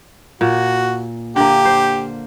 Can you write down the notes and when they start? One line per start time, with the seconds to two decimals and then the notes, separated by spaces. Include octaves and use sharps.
0.41 A#2 F#4
1.36 D3 A#3 G4
1.65 C5